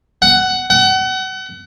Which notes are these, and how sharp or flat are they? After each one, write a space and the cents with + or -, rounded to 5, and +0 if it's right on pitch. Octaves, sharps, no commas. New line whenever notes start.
F#5 +15
F#5 +35